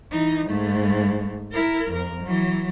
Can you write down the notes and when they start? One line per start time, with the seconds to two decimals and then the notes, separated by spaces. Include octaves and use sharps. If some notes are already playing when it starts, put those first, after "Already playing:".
0.11 E3 D#4
0.48 G#2 A3
1.52 E4 A#4
1.91 F2 A#4
2.23 E3 F#3